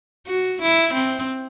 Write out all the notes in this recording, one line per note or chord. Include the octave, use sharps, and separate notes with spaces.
F#4
E4
C4